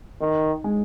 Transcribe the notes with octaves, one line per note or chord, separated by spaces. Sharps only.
D#3 D#4
G#3